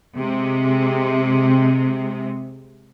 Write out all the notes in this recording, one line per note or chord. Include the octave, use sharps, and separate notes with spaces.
C3 G#3